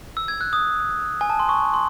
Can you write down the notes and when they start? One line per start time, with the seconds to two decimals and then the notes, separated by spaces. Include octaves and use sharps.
0.17 E6
0.28 G#6
0.41 F#6
0.53 D#6
1.21 G#5
1.30 A5
1.39 C6
1.49 C#6
1.74 C6